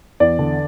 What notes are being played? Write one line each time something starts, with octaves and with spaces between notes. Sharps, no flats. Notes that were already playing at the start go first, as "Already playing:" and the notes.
E2 D5
D3